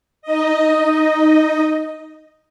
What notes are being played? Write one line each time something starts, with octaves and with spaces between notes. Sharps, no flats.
D#4 D#5